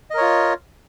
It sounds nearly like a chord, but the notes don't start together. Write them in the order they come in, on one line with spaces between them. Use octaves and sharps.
D#5 A#4 C#5 F4